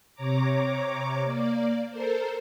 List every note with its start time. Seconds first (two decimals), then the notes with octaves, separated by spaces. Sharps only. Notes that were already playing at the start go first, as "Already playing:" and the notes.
0.15 C3 C#5 A#5 D6
1.24 A#3 D5
1.89 A4 A#4 C5